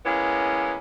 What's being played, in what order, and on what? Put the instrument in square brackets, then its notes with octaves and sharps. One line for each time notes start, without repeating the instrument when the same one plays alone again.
[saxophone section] G#3 A#3 B3 C#4 E4